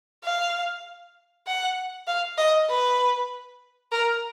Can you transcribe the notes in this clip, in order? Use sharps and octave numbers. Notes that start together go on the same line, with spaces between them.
F5
F#5
F5
D#5
B4
A#4